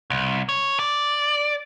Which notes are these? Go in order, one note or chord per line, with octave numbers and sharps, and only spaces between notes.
C2
C#5
D5